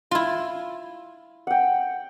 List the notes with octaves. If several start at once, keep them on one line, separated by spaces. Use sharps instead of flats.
E4 F4
F#5 G5